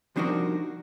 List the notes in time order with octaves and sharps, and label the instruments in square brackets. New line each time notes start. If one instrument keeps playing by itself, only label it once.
[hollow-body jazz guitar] C2 F3 D4 D#4 F#4 A#4